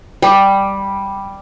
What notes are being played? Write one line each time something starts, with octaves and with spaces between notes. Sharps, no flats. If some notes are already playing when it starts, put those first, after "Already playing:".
G3